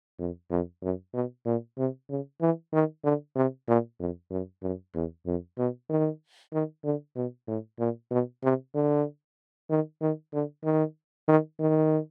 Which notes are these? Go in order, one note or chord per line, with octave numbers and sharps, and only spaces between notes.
F2
F2
F#2
B2
A#2
C3
C#3
E3
D#3
D3
C3
A#2
F2
F#2
F#2
E2
F2
B2
D#3
D#3
D3
B2
A2
A#2
B2
C3
D3
D#3
D#3
D3
D#3
D#3
D#3